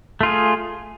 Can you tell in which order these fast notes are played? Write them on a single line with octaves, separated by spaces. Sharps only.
A3 F4 G#4